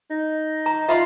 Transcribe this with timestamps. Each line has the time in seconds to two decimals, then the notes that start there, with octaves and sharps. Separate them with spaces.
0.10 D#4
0.66 A#5
0.88 F4 E5 B5 C6